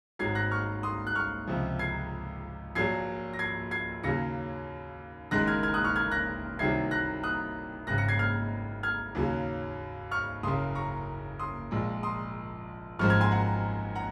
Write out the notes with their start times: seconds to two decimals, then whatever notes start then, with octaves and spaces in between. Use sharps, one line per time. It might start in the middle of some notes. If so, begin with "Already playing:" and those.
0.19 G#1 G#2 F#3 G#6 C7
0.35 F#6 A#6
0.51 C#6 F6
0.83 C6 D#6
1.07 F#6
1.15 C#6 F6
1.47 C#2 C3 F3
1.79 G#6 C7
2.75 A#1 A#2 F#3 G#6 C7
3.33 A#6
3.39 G#6 C7
3.71 G#6 C7
4.03 D#2 C#3 F#3 A#6 C#7
5.31 F#1 F#2 D#3 G#3 F#6 A#6
5.47 F6 G#6
5.63 F6 G#6
5.74 D#6 F#6
5.84 C#6 F6
5.96 F6 G#6
6.11 F#6 A#6
6.59 C2 C3 D#3 F#3 G#6 C7
6.91 F#6 A#6
7.23 D#6 F#6
7.87 G#1 F#2 C#3 F#6 A#6
7.98 A#6 C#7
8.08 G#6 C7
8.19 F6 G#6
8.83 F6 G#6
9.15 D#2 C#3 F#3
10.11 C#6 F6
10.43 F#1 F#2 C#3 C6 D#6
10.75 A#5 C#6
11.39 C6 D#6
11.71 A#1 A#2 G#3
12.03 C6 D#6
12.99 G#1 F#2 F3 G#3 C#6 F6
13.10 F6 G#6
13.21 G#5 C6
13.31 F#5 A#5
13.95 F#5 A#5